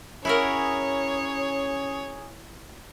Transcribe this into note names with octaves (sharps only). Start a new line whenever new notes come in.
C#4 E4 F#4 G#4 A#4 C#5